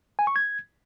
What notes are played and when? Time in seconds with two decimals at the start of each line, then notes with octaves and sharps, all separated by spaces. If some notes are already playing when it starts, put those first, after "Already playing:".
0.19 G#5
0.27 C#6
0.36 G#6